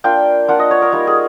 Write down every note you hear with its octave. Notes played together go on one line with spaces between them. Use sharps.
A#3 D4 F4 G5
A#3 D4 F4 F#5
D#5
C#5
A#4
G3 A#3 D#4
G#4